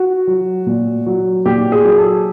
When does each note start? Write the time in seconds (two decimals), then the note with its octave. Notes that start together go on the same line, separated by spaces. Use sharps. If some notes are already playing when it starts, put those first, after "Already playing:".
Already playing: F#4
0.27 F#3
0.66 A#2
1.06 F#3
1.45 A#2 G4
1.72 G#4
1.84 F#3
1.98 A4